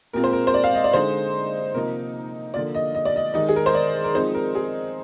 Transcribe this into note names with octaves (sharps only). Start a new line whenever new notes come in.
A#2 G#3 C4 F4 A#4
C5
A#4
C5
D5
F5
D#5
D5
D3 G#3 D#4 C5
C3 F3 A#3 D#4 A#4
D3 F3 A#3 F4 D5
D#5
D#5
D5
D#5
D#3 G#3 D#4 D#5
G#4
A#4
C5
D5
A#4
F3 G#3 C4 D#4 C5
A#4
G#4